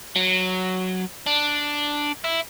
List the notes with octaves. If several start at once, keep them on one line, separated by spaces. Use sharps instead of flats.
F#3
D4
E4